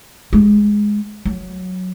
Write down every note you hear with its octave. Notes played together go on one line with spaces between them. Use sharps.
G#3
F#3